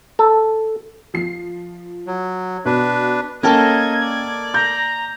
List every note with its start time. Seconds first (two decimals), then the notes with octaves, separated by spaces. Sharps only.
0.19 A4
1.14 F3 C7
2.07 F#3
2.65 B2 D4 B4
3.43 A#3 C#4 A4 A#4 D#5 G5 A5 G#6
4.02 D5
4.54 A#5 G6